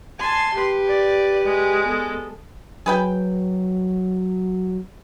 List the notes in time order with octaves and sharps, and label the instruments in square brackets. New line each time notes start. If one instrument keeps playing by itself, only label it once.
[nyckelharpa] G#5 A5 [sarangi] C6
[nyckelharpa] G4 B4
[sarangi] D5
G#3
[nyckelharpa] B3 A4
[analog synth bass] F#3 [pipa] G#4 B4 G5